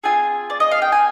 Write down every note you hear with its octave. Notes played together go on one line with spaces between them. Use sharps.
C4 F4 G#4 G#5
D5
D#5
F5
G5
G#5